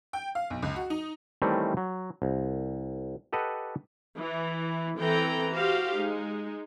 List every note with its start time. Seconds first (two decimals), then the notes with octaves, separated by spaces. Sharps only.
0.13 G5
0.35 F5
0.50 B1
0.62 C#2
0.76 F#4
0.90 D#4
1.42 D#3 E3 G3 A3 C4 C#4
1.77 F#3
2.22 C2
3.33 G4 A4 B4 D#5 F#5
4.16 E3
4.98 E3 C4 A4 G5 A#5
5.50 F#4 G4 C5 F5
5.94 G#3 D#4